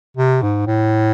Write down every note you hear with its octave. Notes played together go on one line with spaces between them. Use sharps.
C3
G#2
A2